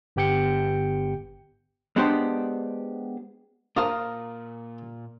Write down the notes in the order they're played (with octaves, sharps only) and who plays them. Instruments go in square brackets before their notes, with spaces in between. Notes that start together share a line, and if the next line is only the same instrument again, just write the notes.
[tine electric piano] G1 B3 G4 G5 G6 C#7
[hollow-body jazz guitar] G#3 B3 D4 G4 C5
[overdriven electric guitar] A#2 [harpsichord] D4 F4 C5 [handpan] A#4 [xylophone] F5 A#5 D#6